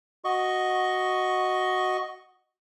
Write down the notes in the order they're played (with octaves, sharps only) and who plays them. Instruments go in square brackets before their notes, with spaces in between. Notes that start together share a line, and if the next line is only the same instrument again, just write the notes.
[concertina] F#4 D#5 C#6